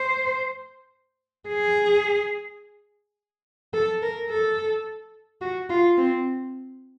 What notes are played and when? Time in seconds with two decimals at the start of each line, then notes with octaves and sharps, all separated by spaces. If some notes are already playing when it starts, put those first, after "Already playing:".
Already playing: C5
1.49 G#4
3.73 A4
4.02 A#4
4.30 A4
5.42 F#4
5.70 F4
5.98 C4